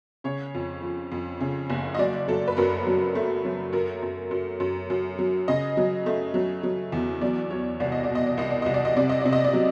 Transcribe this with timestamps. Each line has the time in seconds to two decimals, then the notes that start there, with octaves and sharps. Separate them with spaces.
0.24 C#3 C#5
0.55 F2
0.83 F3
1.12 F2
1.40 C#3
1.70 F#1
1.94 D#5
1.99 F#3 D5
2.28 F#3 A4
2.48 B4
2.57 F#2 A#4
2.87 F#3
3.15 A3
3.45 F#3
3.73 F#2 A#4
4.02 F#2
4.31 F#2
4.60 F#2
4.90 F#2
5.19 F#3
5.48 C#3 D#5
5.77 F#3
6.06 A3
6.34 F#3
6.63 F#3
6.92 E2
7.21 F#3 D5
7.50 F#3 C#5
7.80 C2 D5
7.92 D#5
8.04 D5
8.09 B2
8.15 D#5
8.27 D5
8.38 C2 D#5
8.51 D5
8.62 C2 D#5
8.74 D5
8.85 D#5
8.96 C3 D5
9.09 D#5
9.21 C3 D5
9.33 D#5
9.45 D5
9.53 F#3